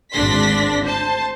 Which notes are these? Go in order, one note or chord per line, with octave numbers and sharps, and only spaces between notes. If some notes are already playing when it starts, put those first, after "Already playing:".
G#1 D2 D4 C6 A#6 B6
C5 A5